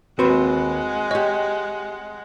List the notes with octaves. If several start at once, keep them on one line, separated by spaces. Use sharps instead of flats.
D#2 G#3 C4 F#4 B4 C5 F#5
G4 C#5 D#5